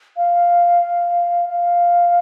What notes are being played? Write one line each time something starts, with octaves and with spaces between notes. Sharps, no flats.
F5
F5